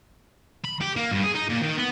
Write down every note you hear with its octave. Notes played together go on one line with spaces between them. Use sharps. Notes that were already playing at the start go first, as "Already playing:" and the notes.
B5
G4
A#3
G2
G#4
D#4
A#2
D#3
B3